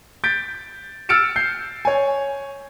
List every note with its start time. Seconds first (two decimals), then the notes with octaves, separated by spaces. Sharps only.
0.24 G6 A6 B6 D7
1.09 E6 F6 A6 C#7 D7 E7
1.36 G6 C7
1.85 C#5 G#5